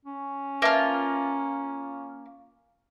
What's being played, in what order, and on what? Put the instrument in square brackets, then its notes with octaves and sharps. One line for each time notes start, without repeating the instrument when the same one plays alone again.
[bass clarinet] C#4
[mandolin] A#3 F4 [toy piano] B4 E5 A5